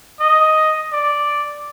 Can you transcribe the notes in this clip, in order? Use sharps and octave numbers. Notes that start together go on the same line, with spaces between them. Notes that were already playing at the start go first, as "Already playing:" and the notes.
D#5
D5